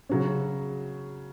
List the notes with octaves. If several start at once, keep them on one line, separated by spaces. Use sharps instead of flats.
C#3 F#3 C#4